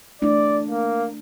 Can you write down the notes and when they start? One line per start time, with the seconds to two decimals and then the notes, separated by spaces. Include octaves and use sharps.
0.22 A3 D4 E4 D5
0.70 A#3